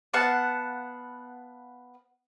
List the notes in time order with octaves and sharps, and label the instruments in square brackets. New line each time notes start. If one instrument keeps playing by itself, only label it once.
[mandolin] B3 F5 F#5 A5